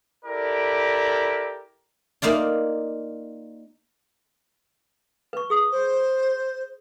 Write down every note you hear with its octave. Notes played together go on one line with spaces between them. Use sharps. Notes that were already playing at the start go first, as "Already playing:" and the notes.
E4 G4 A4 A#4 D5
A#3 D#4 F4 D5
B4 C#6
G#4 D#6
C5